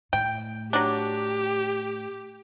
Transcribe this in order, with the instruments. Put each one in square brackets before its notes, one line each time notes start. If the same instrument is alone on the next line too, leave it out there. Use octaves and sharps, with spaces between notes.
[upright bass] A2 [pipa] G5
[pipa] F#3 D4 [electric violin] G4